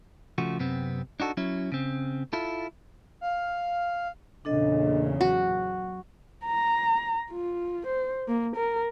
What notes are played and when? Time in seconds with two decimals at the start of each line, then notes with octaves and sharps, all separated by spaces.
0.38 C#3 F3 A3 F#4
0.60 F#2 C3 B3 C4
1.20 D4 D#4 F#4 A4
1.37 F#3 C#4 E4
1.72 C#3 C4
2.33 E4 F4 A4
3.21 F5
4.45 E2 A#2 C#3 D4 A4 D#5
5.21 F#3 F#4
6.46 A#5
7.32 F4
7.88 C5
8.29 A#3
8.57 A#4